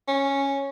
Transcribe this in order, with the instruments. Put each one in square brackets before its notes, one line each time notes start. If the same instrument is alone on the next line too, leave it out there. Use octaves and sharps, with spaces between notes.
[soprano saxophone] C#4